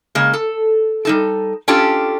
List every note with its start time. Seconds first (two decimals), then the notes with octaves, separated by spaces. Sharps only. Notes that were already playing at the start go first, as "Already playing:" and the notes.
0.15 C#3 G#3 A#3
0.33 A4
1.05 G3 D#4 A4
1.68 C#4 D4 F4 G4 A4 D5